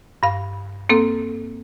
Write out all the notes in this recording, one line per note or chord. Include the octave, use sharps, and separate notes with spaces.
G2 F5
A#3 C4 A4